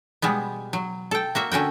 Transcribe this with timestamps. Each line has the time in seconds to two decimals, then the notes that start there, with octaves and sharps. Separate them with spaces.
0.22 B2 G3 G#3 B3
0.73 F#3
1.11 A4 G5
1.35 A#3 F#4 E5
1.52 D3 C#4 F#4 G5